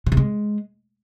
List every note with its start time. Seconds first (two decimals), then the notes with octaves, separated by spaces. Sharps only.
0.06 C#3
0.12 C3
0.17 G#3